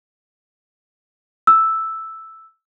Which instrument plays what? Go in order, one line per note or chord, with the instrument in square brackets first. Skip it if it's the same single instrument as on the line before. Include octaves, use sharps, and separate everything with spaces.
[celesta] E6